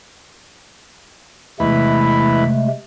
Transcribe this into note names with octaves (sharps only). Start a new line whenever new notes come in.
E2 C3 G#3 A3 B4